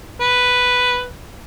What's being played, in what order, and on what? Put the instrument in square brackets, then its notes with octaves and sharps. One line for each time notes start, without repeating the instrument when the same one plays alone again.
[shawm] B4